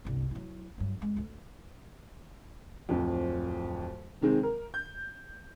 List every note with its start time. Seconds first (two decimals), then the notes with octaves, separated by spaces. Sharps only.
0.05 G1 C2
0.31 F#3 E4
0.78 G2 F#3
1.01 F2 G#3
1.16 D2 D3
2.89 D1 F2
4.21 C3 D#3 G#3 C4
4.43 A#4
4.74 G6